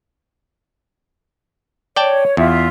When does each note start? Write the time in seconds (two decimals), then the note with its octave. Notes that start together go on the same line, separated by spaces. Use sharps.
1.96 C#5 D5 G5 A5
2.37 E2 F4 E5